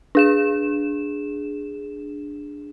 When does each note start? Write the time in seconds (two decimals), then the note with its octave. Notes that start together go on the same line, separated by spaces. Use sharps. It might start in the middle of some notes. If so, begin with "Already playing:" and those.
0.15 D4 G#4 E7